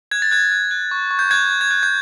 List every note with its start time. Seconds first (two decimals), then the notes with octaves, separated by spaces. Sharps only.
0.11 F#6 G#6
0.22 A6
0.31 F#6 G#6
0.52 F#6
0.71 F#6
0.91 C#6
1.11 C#6
1.19 G6
1.31 F#6 G#6
1.51 F#6
1.61 G#6
1.71 F#6
1.83 G6